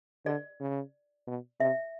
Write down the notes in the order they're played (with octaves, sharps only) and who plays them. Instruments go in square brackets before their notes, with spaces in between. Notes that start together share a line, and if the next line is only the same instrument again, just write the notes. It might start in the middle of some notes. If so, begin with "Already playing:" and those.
[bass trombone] D3 [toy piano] D5
[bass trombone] C#3
B2
[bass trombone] C3 [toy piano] E5